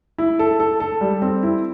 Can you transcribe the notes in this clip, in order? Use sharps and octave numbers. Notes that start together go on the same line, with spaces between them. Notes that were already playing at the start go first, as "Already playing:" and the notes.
E4
A4
A4
A4
G3
C4
E4